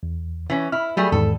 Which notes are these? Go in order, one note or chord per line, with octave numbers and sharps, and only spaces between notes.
E2
E3 C#4
E4 F6
F#3 G3 A3 G#4
E2 G#2 D#3 A4